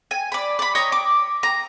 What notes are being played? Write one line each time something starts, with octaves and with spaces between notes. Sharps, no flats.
G#5
D5 B5
D5 B5
C#5 D#5 A#5
D6
A#5